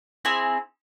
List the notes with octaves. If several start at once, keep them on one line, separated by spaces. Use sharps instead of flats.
C4 E4 G#4 G#5